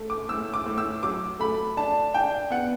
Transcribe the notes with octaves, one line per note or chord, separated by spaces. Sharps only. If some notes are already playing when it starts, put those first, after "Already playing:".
Already playing: A3
D6
A2 E6
D6
A2
E6
F#3 D6
A3 B5
D4 A5
D4 G5
B3 F#5